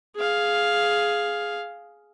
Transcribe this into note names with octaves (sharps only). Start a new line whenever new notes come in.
G#4 F5